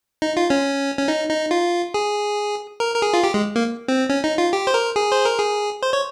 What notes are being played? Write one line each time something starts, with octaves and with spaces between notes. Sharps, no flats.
D#4
F4
C#4
C#4
D#4
D#4
F4
G#4
A#4
A#4
G#4
F4
G4
G#3
A#3
C4
C#4
D#4
F4
G4
C5
A#4
G#4
C5
A#4
G#4
C5
C#5